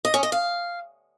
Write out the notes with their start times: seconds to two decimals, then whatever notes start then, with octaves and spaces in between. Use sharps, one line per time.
0.05 D#5
0.14 C#4
0.23 D#5
0.32 F5